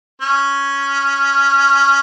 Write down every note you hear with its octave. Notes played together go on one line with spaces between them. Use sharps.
C#4